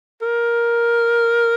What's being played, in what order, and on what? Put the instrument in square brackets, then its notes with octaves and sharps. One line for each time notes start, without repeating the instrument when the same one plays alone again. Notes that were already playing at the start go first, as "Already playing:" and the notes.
[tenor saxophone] A#4